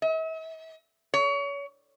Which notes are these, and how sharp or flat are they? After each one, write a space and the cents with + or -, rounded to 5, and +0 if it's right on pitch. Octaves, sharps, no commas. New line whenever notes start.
E5 -45
C#5 +30